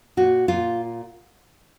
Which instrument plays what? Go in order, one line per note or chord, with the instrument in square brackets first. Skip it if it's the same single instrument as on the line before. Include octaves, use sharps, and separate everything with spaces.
[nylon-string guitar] A#2 F#4
A#2 F4